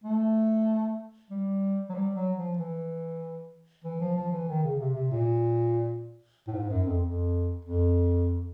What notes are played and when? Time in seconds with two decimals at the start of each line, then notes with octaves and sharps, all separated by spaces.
0.04 A3
1.31 G3
1.90 F#3
1.94 G3
2.15 F#3
2.37 F3
2.57 E3
3.85 E3
4.01 F3
4.16 F3
4.32 E3
4.48 D#3
4.64 C#3
4.80 C3
4.96 C3
5.12 A#2
6.48 A2
6.54 G#2
6.70 F#2
6.86 F2
7.03 F2
7.65 F2